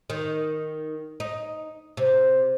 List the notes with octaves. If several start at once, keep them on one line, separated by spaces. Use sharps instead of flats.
D#3
D#4
C3